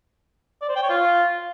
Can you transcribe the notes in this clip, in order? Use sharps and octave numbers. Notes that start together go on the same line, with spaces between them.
D5
C5
G5
C#5
F4